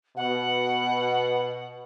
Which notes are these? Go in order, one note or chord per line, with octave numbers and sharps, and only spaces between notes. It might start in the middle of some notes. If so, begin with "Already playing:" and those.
B2 F#5